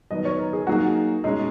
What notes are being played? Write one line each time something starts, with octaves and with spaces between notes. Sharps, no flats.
D#3 F#3 B3 D#5
C#5
A#4
G#4
F#3 A#3 D#4 F#4 G#4
B2 G#3 C#4 D#4 G#4